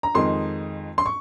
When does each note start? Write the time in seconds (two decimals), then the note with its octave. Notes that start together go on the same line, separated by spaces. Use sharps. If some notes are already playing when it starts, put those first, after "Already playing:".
0.03 A#5
0.15 F2 D#3 G#3 D#4 C6
0.98 C6
1.06 C#6